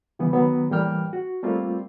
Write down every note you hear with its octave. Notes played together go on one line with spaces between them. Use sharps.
C#3 E3 G3 B3
D#3 F#3 B3
A2 E3 G3 A#3 G5 F6
F#4
G3 A3 A#3 C4 F4